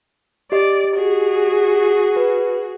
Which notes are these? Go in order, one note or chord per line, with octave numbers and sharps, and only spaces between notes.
G4 D5 D#5
F#4 G#4
B4